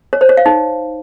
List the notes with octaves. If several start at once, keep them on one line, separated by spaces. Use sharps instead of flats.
C#5
C5
C#5
F5
D#4